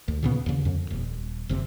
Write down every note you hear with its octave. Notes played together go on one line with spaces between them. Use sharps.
D2
A#2 C#3 B3
D#2 C#3
F2
D#1
F#1 C3